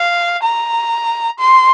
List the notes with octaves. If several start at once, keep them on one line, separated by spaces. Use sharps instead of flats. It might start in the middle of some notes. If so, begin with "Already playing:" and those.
Already playing: F5
A#5
C6